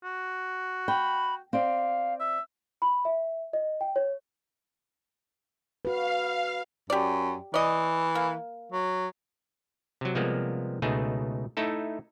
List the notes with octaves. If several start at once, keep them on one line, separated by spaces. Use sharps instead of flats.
F#4
G5 B5
C4 D5 F5
E5
B5
E5
D#5
G5
C#5
F#4 B4 F5
F#2 G4 D5
E3 D5 D#5
A#3
F#3
C3 F#3
C3 F3 G3 G#3 A#3 B3
C#2 B2 A3 D#4 G#4
A3 D#4 E4 A4